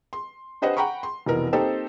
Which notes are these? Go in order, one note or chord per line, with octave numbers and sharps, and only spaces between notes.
C6
D4 G4 B4 C5 D#5 F#5
F#5 G5 A#5 B5 C#6
C6
F1 B2 E3 A#4
A#3 C4 D#4 G4 A4 C5